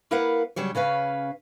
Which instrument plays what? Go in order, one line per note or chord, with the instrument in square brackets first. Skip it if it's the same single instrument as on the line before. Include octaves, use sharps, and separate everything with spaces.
[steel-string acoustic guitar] A#3 E4 A#4 B4 F5 F#5
C#3 F#3 G3 C#5
C#3 C#4 B4 F5